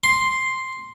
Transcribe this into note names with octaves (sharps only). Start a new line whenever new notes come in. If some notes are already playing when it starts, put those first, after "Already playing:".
C6